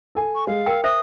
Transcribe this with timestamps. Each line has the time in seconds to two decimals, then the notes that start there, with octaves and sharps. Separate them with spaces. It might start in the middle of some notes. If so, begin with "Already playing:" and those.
0.15 A4 G#5
0.35 C#6
0.47 G#3 F5
0.66 A#4 G5 E6
0.84 C5 E5 D#6